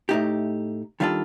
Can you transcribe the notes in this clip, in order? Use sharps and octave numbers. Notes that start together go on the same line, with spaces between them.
A2 A3 D#4 G4
D#3 G3 D4 F4 A4